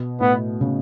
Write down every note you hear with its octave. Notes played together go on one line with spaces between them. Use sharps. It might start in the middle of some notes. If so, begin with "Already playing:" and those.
Already playing: B2
A2 B3
C#3